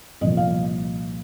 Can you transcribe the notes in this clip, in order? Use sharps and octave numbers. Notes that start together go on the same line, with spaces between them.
C2 A#2 F3 A#3 D#5
F5